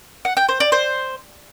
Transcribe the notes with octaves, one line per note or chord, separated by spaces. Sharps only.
F#5
G5
C5
D5
C5